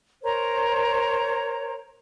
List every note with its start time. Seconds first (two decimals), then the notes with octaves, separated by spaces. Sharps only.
0.23 A#4 C5 C#5 A#5